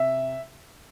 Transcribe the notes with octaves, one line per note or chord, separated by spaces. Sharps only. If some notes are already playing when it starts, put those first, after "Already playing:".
Already playing: C3 E5